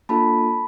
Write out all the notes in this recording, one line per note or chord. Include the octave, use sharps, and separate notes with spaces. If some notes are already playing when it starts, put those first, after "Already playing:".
A#3 D4 F4 A4 A5 B5